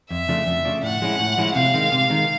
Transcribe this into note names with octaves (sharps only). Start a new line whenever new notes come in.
F2 E5
C#3 F3 A3 D4
F2
C#3 F3 A3 D4
A2 F#5
F3 G#3 C#4 E4
A2
F3 G#3 C#4 E4
C3 F5
D#3 G#3
C3
D#3 G#3